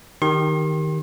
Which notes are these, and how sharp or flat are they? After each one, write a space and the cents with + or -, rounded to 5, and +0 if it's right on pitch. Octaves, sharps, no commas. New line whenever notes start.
D#3 +0 G4 +0 C6 +40